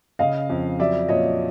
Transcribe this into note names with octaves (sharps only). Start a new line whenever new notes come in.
C#3 D#5 F5
F2
F#3 D5 E5
A#2 C#5 D#5